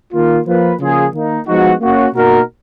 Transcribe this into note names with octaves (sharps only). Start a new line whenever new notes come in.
D#3 A#3 F4
F3 A#3 F4 B4
C#3 F3 A#3 F4 G#4
D#3 A#3 D#4
F3 G#3 B3 D#4 F#4
A#3 C#4 F#4
B2 A#3 D#4 F#4 A#4